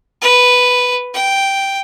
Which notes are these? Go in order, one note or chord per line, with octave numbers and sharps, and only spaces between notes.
B4
G5